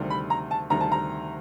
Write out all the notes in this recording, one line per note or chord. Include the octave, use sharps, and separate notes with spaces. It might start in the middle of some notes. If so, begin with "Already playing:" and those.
Already playing: D2 C3 D#3 G3
B5
A#5
A5
D2 C3 D#3 G3 A#5
A5
A#5